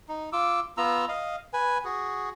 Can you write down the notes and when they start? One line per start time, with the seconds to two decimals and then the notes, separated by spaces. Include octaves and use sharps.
0.09 D#4
0.33 F4 D6 E6
0.77 B3 F4 A#5 E6
1.09 D#5 F5
1.53 B4 G#5
1.85 F#4 G#4